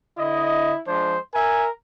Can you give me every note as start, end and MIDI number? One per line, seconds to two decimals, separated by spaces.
0.18 0.73 50
0.18 0.82 64
0.18 0.73 75
0.88 1.16 53
0.88 1.16 56
0.88 1.16 62
0.88 1.19 72
1.35 1.70 70
1.35 1.66 76
1.35 1.66 80